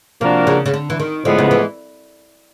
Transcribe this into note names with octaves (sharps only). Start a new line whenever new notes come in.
C3 F3 A#3 D4 F#4 A#4
C#3
C#3
D3
E3
D#3
A2 D3 F3 G#3 B3
C#3
E3